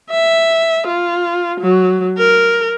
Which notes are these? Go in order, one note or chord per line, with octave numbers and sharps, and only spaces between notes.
E5
F4
F#3
A#4